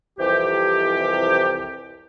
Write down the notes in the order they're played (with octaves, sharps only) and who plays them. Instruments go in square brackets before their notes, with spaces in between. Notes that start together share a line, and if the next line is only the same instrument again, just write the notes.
[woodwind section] C2 F2 C3 E3 G4